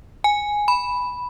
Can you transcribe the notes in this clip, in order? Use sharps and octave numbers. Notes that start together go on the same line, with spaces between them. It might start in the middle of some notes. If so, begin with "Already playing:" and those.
G#5
B5